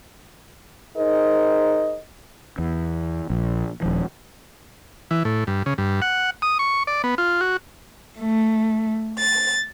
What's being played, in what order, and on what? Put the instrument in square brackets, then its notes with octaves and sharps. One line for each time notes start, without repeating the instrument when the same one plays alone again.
[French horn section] D#4 G#4 A#4 C5 D#5
[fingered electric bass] E2
A#1
D#1 F3
[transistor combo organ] E3
A2
G2
C#3
G2
F#5
D#6
C#6
D5
B3
F4
F#4
[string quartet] A3
A6